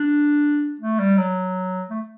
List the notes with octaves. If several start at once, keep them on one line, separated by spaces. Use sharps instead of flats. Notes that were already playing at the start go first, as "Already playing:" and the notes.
Already playing: D4
A3
G3
F#3
A3